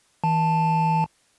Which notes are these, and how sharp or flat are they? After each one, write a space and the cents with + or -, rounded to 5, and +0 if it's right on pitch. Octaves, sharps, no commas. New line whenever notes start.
E3 -35 A5 +0